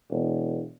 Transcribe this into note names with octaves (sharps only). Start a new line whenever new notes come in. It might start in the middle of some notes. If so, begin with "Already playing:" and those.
E1